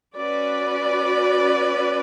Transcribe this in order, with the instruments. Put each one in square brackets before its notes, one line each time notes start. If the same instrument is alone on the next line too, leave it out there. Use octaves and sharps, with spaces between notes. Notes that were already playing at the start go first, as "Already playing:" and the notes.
[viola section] C#4 F#4 B4 D5